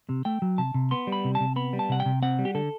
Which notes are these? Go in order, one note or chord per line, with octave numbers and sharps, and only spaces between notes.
C3
A3 G5
F#3
C3 A5
C3
B3 C6
G3
B5
C3
A5
C3
B3 B5
G3
A5
C3 F#5
G5
C3
C4 F#5
G3
G4
D3 A4